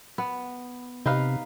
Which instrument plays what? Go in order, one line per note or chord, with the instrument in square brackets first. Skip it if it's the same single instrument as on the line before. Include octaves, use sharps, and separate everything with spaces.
[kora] B3
[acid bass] C3 [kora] D#4 B4 F5